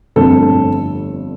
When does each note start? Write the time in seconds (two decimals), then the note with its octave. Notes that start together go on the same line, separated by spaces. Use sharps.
0.16 G1 F2 D3 A3 C4 A4